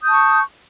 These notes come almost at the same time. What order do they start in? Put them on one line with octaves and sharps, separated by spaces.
D#6 G6 A5 C#6